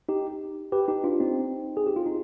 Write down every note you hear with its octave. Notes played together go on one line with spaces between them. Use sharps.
D#4 G4
G4 B4
D#4 G4
D4 F4
C4 D#4
G#4
G4
F4
D#4